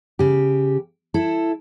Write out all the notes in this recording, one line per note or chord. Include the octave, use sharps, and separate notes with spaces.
C#3 G4
E4 A4